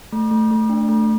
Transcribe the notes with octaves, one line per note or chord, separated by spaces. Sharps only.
A3
A3
A3
D4
A3